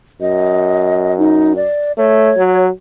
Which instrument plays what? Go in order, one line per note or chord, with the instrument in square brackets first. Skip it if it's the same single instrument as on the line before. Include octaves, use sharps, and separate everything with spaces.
[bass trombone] F#2 [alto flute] D#5
[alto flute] D#4
D5
[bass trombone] A3 [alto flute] C#5
[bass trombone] F#3